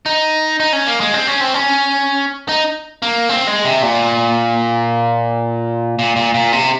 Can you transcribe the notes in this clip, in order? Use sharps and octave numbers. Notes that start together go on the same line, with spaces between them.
D#4
D#4
C#4
A#3
G#3
C4
C#4
C4
C#4
D#4
A#3
C4
G#3
C3
A#2
A#2
A#2
A#2
C3